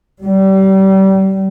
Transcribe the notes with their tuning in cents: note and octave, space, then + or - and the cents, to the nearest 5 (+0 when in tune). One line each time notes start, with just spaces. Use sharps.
G3 -30